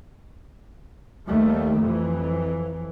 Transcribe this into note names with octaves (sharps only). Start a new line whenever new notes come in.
D#2 D#3 G3 A3
F2 E3